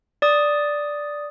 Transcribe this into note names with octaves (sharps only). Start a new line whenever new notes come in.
D5 D#6